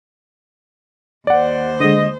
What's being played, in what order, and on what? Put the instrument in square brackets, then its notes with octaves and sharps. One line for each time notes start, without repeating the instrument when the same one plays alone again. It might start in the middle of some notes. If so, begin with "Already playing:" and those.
[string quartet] D#2 C5 [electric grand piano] D5 F#5
[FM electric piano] D3 G#3 [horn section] D#5